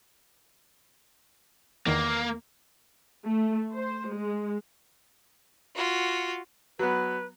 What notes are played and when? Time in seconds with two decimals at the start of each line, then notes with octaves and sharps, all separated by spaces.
1.87 E2 D#3 A#3
3.26 A3
3.74 C5
4.15 G#3
5.75 F4 F#4
6.79 F#3 B3 B4